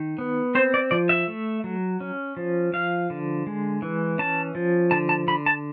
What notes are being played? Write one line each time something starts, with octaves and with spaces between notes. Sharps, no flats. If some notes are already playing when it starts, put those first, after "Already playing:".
Already playing: D#3
B3
C4 C5
D5
F3 D5
E5
A3
F#3
C#4
F3
F3 F5
D3
G#3
E3
C#4 A5
F3
D3 A5
A5
D3 B5
A5